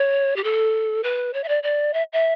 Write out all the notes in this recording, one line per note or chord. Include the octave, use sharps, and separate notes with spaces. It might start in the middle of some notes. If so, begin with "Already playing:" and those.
Already playing: C#5
G4
A4
B4
C#5
E5
D5
D5
E5
E5